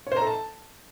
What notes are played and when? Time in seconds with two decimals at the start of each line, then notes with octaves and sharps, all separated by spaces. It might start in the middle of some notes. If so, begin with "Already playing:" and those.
0.07 C#5
0.12 C5
0.17 A#5
0.22 A4
0.27 A5